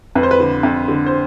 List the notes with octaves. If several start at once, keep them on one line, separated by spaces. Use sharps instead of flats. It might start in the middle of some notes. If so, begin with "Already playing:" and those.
F2 B4
C5
B4
D3
F2
D3
C5